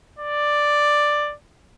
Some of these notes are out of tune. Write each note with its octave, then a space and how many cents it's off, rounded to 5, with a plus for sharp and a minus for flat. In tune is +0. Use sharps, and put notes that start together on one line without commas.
D5 +5